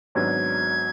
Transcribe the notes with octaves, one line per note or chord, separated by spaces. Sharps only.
G#1 G#2 F#3 B3 D4 G#6